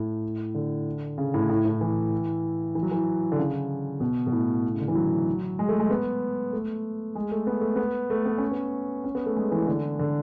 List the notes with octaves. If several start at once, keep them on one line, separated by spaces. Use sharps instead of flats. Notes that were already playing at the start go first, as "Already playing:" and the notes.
Already playing: A2
D3
C#3
A2
A2
A2
E3
E3
F#3
E3
D3
C#3
B2
B2
A2
C#3
D3
E3
F#3
G#3
A3
G#3
B3
A3
G#3
A3
B3
A3
B3
A3
B3
C#4
B3
C#4
B3
A3
G#3
E3
D3
D3